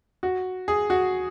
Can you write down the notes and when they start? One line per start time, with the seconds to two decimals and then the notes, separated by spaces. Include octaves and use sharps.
0.23 F#4
0.68 G#4
0.90 F#4